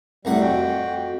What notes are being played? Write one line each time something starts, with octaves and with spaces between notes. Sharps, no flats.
C2 A2 G3 F#5
F2 F#4 G5